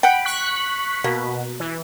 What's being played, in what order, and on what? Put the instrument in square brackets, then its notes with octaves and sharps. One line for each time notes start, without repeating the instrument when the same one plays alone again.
[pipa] F#5 G5 [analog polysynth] B5
[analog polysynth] C#6 F#6 B6
[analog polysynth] B2 [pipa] A#3
[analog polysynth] E3